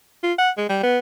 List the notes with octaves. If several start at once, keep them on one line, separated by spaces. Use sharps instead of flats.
F4
F#5
G#3
G3
B3